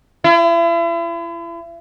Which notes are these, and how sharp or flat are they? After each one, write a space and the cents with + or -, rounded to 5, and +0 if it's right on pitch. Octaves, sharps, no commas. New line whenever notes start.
E4 +40